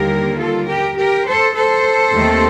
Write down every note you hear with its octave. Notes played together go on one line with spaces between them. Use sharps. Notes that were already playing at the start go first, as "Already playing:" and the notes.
Already playing: D#2 D3 G3 A#3 G4 A#4
F4 A4
G4 A#4
G4 A#4
A4 C5
A4 C5
D#2 D#3 A3 C4